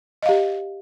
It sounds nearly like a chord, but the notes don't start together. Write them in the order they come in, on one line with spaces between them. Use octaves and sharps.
D#5 F5 G4